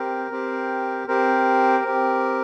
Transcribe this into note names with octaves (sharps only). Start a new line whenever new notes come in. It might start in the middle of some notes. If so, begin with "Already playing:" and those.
Already playing: C4 G4 A#4
C4 G4
C4 G4 A#4
C4 G4